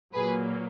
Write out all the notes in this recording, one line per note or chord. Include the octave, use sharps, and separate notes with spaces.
A#2 F#3 A#3 G#4 B4